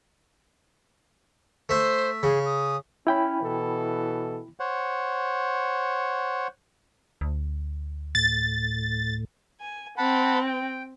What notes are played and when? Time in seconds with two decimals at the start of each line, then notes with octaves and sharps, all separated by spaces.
1.69 A3 C5 E5
2.23 C#3 G#4
2.45 D#6
3.07 C#4 E4 G5 B5
3.41 B2 E3 A4
4.60 C5 C#5 F#5
7.21 D2
8.15 A2 A6
9.60 G#5
9.98 C4 F#5 A5 B5
10.46 G5